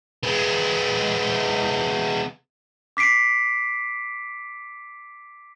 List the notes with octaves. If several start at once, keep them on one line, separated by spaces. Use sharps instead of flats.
G#3 B3
D6 B6 C7 D7